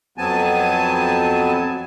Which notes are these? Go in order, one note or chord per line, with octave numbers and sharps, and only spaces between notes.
F2 F#3 B3 C4 G#5 A5